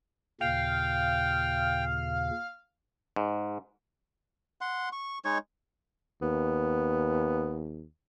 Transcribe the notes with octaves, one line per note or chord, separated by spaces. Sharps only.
D#2 A#2 C#3 F5 G5
G#2
F#5 C6
C#6
G#3 D#4 C#5 C#6
D#2 B3